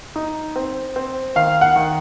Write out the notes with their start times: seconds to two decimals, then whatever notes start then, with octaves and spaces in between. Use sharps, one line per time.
0.16 D#4
0.56 C4
0.96 C4
1.36 D#3 F5
1.61 F#5
1.76 D#3